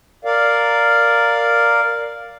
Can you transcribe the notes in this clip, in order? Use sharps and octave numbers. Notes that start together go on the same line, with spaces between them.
A#4 D5 F5